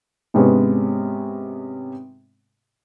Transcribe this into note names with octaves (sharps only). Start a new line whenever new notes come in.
G#2 C3 G#3 B3 C#4